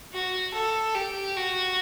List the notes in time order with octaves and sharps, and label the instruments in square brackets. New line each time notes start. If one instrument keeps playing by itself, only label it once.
[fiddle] F#4
A4
G4
F#4